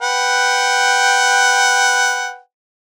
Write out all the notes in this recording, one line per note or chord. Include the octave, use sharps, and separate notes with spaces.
B4 F#5 G5